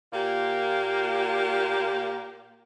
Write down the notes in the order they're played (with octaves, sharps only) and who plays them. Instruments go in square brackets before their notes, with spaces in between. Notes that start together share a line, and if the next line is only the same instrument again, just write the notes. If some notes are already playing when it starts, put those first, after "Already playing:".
[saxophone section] A#2 A#3 F4 G4